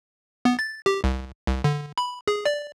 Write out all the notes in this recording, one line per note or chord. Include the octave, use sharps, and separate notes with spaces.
B3
A6
G4
C2
C2
D3
B5
G#4
D5